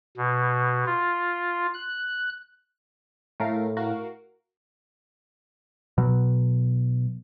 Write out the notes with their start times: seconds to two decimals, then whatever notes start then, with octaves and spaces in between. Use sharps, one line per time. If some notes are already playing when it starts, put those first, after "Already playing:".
0.17 B2
0.86 F4
1.74 F#6
3.40 A2 A3 A#4 F5
3.77 F#4 A#4 F5
5.98 B2 F#3